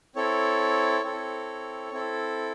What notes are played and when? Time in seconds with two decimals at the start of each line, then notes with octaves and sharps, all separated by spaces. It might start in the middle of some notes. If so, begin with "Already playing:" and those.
0.16 C4 E4 A4 C#5
1.03 C4 E4 A4
1.92 C4 E4 A4